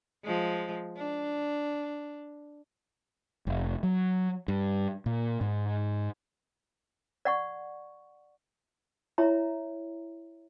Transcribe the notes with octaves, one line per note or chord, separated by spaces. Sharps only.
F3 G#3
D4
F1
F#3
G2
A#2
G#2
D5 F#5 C#6
E4 C#5 E5 A#5